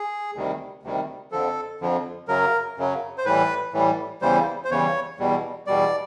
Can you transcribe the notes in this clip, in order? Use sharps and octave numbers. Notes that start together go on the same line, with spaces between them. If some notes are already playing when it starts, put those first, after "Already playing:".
Already playing: G#4
D2 C3 D#3 G3
D2 C3 D#3 G3
F2 D3 F3 A4
F2 D3 F3
F#2 C#3 F#3 A#4
F#2 C#3 F#3
C5
A2 E3 G3 B4
A2 E3 G3
E2 C#3 E3 G3 C5
C5
E2 C#3 E3 G3 C#5
E2 B2 G3
E2 B2 G3 D5